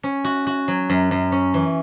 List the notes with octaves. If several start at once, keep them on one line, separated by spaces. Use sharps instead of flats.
C#4
F#4
F#4
F#3
F#2
F#2
C#4
E3